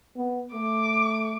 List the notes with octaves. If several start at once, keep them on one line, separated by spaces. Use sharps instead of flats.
B3
A3 D6